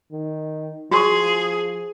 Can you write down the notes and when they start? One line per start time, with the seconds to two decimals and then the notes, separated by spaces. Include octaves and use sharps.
0.12 D#3
0.91 F3 F#4 G#4 C6 C#6